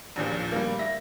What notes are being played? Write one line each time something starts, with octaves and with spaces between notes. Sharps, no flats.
A#1 D#2 A#2 F3
G3 A#3
E5 A#6